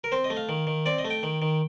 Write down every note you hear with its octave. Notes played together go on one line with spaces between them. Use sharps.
A#4
C4 C5
D#5
A3
F5
D#3
D#3
C4 D5
D#5
A3
G5
D#3
D#3